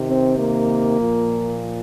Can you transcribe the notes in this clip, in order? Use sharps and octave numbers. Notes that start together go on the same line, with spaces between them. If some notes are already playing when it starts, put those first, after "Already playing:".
Already playing: C3 D#3
C4
A#3
A#2 F3